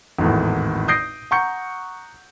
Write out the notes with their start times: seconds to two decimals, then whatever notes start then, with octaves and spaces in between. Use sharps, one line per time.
0.19 G#1 E2 A2
0.88 D#6 G6 A#6 C7 D7
1.31 F#5 A#5 C#6 G6 C#7